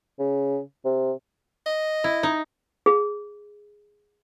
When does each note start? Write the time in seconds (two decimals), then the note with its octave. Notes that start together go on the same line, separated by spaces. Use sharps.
0.19 C#3
0.85 C3
1.66 D#5
2.04 E4
2.23 D#4
2.86 G#4